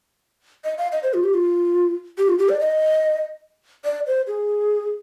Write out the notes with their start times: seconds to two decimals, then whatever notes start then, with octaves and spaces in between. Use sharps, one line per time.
0.64 D#5
0.78 F5
0.92 D#5
1.03 C5
1.14 F4
1.24 G4
1.34 F4
2.18 G4
2.28 F4
2.39 G4
2.49 D5
2.60 D#5
3.85 D5
4.07 C5
4.27 G#4